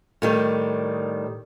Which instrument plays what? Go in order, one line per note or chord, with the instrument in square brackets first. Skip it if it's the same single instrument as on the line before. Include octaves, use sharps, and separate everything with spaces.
[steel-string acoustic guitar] A2 D#3 G3